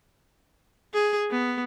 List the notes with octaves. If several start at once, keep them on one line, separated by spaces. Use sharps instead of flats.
G#4
B3